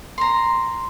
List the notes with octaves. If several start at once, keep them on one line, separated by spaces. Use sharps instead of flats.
A#5 C6